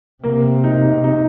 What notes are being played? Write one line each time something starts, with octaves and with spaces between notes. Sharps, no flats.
C3 A#3
D#4
D#4